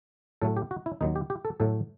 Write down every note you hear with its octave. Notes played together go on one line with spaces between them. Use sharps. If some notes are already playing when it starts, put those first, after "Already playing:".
A2 F#3 A3 A4
G4
F#4
E4
D#2 D#3 F#3 D#4
G4
G4
A4
A2 F#3 A3 A4